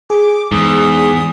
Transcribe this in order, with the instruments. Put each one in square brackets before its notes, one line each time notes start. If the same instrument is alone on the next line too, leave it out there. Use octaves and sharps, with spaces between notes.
[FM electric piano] G#4 [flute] D6
[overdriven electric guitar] E2 [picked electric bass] G#2 [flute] D#6